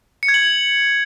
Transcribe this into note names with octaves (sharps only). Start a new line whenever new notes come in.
C#7
G#6
F#7